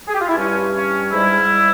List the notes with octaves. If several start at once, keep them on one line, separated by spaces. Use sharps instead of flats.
G#4
G4
F4
E4
G2 G3 C#4
C#4
G#2 G3 E4